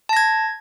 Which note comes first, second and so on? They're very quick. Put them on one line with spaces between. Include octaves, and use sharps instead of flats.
A5 A#6 G#6